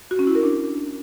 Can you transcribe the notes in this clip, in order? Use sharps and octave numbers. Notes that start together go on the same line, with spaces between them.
F#4
C#4
E4
A#4
D4